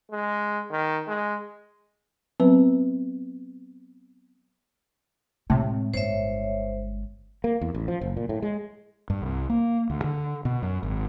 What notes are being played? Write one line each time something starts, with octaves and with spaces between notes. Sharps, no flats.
G#3
D#3
G#3
F#3 B3 C4 B4
A2 C3 G#3
G1 G#3 C5 C#5 E5
A#3
E2
A1
F3
F#1
A#2
A2
G#3
G2
C2
A#3
D2
D3
B2
F#2
G#1